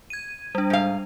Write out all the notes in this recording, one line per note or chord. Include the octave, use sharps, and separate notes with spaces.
G#6 D#7
G3 D4
G#2 F5